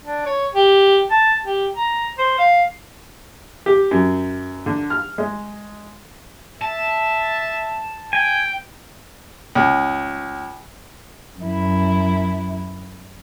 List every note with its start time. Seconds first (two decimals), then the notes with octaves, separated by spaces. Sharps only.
0.04 D4
0.25 C#5
0.55 G4
1.11 A5
1.44 G4
1.75 A#5
2.19 C5
2.39 F5
3.66 G4
3.91 F#2
4.66 D3
4.90 F6
5.18 G#3
6.61 E5 A5
8.13 G5 G#5
9.55 C#2
11.40 F#2 E4